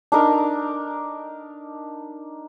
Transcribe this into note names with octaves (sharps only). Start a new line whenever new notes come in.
D4 D#4 A#4